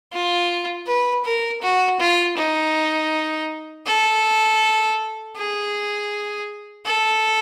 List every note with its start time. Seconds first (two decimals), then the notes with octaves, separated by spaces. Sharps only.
0.13 F4
0.87 B4
1.25 A#4
1.62 F#4
2.00 F4
2.38 D#4
3.87 A4
5.36 G#4
6.86 A4